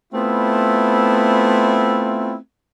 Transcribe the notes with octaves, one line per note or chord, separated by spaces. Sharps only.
A3 B3 C4 E4 F4